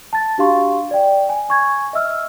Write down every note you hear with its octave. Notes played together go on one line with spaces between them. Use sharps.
A5 A6
D4 F#4 G4 F5 C6 C#6
D5 G5
G#5
G#5 C#6 G#6
D#5 E5 E6 F6